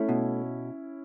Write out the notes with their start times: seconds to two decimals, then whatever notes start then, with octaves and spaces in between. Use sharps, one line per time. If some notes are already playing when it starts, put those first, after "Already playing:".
Already playing: A3 C#4 E4
0.09 B2